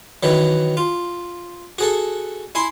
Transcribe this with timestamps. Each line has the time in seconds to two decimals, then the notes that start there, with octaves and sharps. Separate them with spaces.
0.23 D#3 E3 F#3
0.77 F4
1.79 F#4 G#4 A4
2.55 E4 G#5 C6